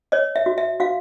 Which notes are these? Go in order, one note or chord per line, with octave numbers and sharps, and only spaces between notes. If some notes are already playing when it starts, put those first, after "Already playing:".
C#5 D#5
E5
F#4
E5
F#4 F5